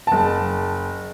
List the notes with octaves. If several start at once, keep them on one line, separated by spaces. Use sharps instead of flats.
F#1 A5